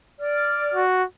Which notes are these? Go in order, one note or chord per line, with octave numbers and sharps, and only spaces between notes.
D5 F6
F#4